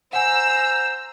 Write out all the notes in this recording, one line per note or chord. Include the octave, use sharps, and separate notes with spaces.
C5 F#5 G#5 A#5 E6